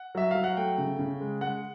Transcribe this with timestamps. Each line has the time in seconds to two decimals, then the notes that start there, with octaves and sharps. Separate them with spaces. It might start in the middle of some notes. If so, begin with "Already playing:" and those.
Already playing: F#5
0.15 F#3 E5
0.31 F#3 F5
0.44 F#5
0.57 A3 G5
0.78 C#3
0.99 C#3
1.21 G#3
1.41 G#3 F#5